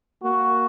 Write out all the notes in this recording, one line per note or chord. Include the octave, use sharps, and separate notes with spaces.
A#3 F#4